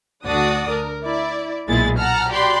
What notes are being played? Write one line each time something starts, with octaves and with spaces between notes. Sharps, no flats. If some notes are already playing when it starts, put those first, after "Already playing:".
D2 D4 F#4 D5 D#6
A#4
E4 D5
B1 A#2 G#3 E4 G#4 A6
F#5 A5 A#5 F6
F#4 G4 D5 G5 B5 C6